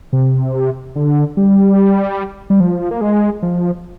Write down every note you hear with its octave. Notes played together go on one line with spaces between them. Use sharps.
C3
D3
G3
G3
F3
A#3
G#3
F3